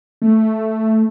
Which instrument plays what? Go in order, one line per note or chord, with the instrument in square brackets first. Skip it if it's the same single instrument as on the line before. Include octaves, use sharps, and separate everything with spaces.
[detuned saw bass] A3